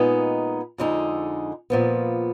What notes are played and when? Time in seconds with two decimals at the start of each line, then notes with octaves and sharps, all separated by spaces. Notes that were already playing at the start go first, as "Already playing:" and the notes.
Already playing: A#2 G#3 B3 D#4
0.78 F2 D3 G#3 D#4
1.70 A#2 F3 B3